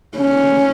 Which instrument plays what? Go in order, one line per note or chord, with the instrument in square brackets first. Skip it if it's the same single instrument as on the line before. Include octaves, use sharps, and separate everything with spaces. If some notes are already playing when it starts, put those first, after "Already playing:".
[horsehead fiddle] C#4